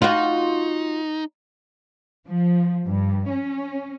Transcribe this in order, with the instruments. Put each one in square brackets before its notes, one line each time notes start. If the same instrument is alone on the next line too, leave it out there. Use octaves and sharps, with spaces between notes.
[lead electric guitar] D#4 [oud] F4 F#4
[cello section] F3
G2
C#4